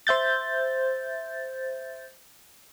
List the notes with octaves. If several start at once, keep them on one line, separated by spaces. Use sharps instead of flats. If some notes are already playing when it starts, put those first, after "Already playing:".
C5 E5 G6 A6